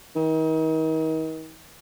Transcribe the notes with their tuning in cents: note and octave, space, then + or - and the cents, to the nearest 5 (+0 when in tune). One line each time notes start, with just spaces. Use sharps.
D#3 +35